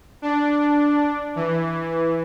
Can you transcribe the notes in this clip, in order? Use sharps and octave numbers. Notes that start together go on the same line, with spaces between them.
D4
E3